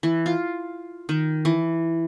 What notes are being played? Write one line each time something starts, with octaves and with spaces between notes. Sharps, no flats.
E3
F4
D#3
E3